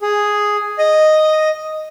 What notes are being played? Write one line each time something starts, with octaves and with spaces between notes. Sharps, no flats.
G#4
D#5